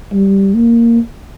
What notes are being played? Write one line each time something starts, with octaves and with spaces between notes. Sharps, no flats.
G3
A#3